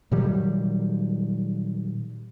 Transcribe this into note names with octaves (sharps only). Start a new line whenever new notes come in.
A#2 D#3 F#3 G3